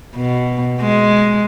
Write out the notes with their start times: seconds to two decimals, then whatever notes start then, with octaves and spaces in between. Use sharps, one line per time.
0.15 B2
0.81 G#3